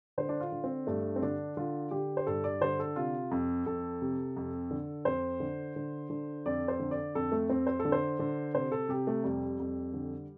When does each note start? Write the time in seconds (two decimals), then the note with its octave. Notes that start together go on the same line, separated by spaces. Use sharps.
0.18 D3 C5
0.29 D4
0.40 F4
0.52 D3
0.64 C4
0.87 G2 A3
1.16 C4
1.22 D3 D4
1.57 D3 F4
1.91 D3 G4
2.17 C5
2.27 G2 A4
2.44 D5
2.61 D3 C5
2.80 A4
2.96 C3 F4
3.31 F2
3.66 F2 A4
4.02 C3
4.36 F2
4.71 D3
5.05 F2 C5
5.40 D3
5.76 D3
6.10 D3
6.46 F2 D5
6.68 C5
6.79 D3
6.91 D5
7.15 F2 A4
7.32 A3
7.49 F2 C4
7.67 C5
7.79 A4
7.85 D3
7.92 C5
8.19 D3
8.54 C3 C5
8.72 A4
8.89 C3 G4
9.07 A3
9.24 F2 G3
9.60 F2
9.94 D3